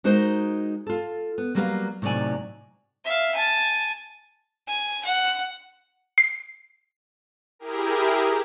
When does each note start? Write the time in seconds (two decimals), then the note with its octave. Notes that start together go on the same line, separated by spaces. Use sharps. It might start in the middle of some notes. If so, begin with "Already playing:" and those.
0.04 G#3 D#4 F#4 A#4 C5 D#5
0.87 F4 A4
1.38 B3
1.55 F#3 G3 A#3 B4 C5 F5
2.02 A2 C3 F#3 D#4 D5 G#5
3.05 E5 F5
3.35 G#5 A5
4.67 G#5
5.05 F#5
6.18 C7
7.59 E4 G4 G#4 A#4